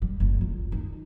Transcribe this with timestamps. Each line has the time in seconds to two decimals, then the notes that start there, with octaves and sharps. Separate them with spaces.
0.02 G3
0.20 F#1
0.41 C#2
0.72 D#4